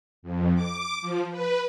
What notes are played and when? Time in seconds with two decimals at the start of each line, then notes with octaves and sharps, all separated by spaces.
0.23 F2
0.54 D6
1.01 F3
1.31 B4